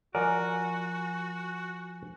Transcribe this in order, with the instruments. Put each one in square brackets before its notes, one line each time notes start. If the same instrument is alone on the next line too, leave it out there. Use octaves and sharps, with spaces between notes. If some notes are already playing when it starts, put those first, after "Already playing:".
[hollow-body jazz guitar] F3 D5 [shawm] F#4 [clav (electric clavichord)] A#4 F#5 [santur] G#5